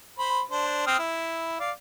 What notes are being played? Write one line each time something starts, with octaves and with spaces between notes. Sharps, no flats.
C5 B5
D4 C5
C4 D#6 F6
E4
D5 F5